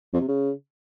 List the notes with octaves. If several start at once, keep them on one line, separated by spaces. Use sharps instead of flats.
F2
C3
C#3